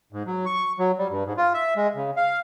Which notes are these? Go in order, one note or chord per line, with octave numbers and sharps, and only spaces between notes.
G#2
F#3
C#6
F#3
G3
G2
G#2
F4
E5
G#3
C#3
F5